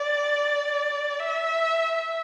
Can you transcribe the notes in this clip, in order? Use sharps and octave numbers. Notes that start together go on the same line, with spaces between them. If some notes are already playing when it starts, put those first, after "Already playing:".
Already playing: D5
E5